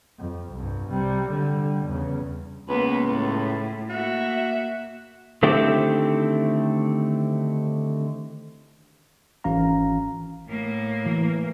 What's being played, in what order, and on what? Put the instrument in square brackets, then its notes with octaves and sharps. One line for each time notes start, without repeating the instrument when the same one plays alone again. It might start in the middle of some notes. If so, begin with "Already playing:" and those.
[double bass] F2
C2 G2
C3 G3
D3 G3
E2 C#3
[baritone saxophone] C#2 [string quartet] A#3 B3 B4
[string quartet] A2
[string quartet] A#3 E5 [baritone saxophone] F#4
[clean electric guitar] D3 D#3 A3 C4 E4 G4
[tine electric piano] G#1 E3 C#4 F5 A#5
[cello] A2 A#3
[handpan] E3